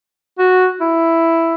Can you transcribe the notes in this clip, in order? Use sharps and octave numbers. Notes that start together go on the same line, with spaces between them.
F#4
E4